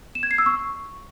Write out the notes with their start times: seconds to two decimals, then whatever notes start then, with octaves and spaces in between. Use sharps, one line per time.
0.15 E7
0.23 G#6
0.31 C7
0.38 E6
0.46 C#6